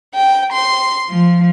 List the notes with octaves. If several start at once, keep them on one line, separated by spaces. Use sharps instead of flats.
G5
C6
F3